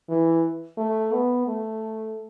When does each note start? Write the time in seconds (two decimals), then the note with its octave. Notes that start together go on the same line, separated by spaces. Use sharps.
0.09 E3
0.78 A3
1.13 B3
1.47 A3